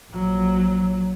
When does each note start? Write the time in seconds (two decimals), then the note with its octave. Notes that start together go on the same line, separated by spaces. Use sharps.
0.12 A#1 F#3